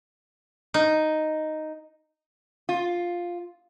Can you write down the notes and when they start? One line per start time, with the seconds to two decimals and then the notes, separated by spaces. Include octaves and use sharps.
0.74 D#4
2.69 F4